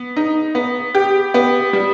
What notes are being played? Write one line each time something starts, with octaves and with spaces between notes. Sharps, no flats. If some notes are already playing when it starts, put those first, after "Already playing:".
Already playing: B3
D#4
B3
G4
B3
G3